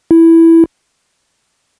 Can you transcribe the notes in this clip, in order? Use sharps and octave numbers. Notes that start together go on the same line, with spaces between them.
E4